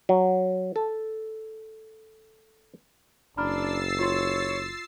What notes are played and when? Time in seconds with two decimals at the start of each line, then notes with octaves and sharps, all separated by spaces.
0.09 F#3
0.76 A4
3.37 F#1 D4 A#5 B5 E6 F6 A6 C7
3.99 F4 C#5 C6